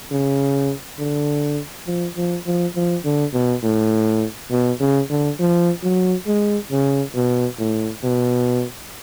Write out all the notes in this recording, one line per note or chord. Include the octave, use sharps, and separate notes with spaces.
C#3
D3
F3
F3
F3
F3
D3
B2
A2
B2
C#3
D3
F3
F#3
G#3
C#3
B2
A2
B2